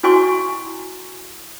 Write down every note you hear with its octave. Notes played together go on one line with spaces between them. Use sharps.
E4 F#4 G#5 C6 C#6